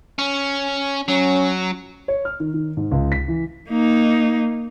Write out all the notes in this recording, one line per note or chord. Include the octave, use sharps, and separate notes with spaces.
C#4
F#3 C#4
C#5
F6
D#3
D#3
G#2
C#2
B6
E3
A#3 D#4